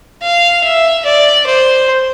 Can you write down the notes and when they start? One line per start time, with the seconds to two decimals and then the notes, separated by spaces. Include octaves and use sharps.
0.23 F5
0.64 E5
1.05 D5
1.46 C5